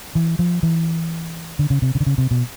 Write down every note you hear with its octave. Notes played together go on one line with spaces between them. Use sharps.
E3
F3
E3
D3
C#3
C3
C#3
D3
C#3
C3
B2